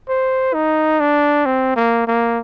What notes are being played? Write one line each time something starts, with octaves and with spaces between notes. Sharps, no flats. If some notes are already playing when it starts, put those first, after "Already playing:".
C5
D#4
D4
C4
A#3
A#3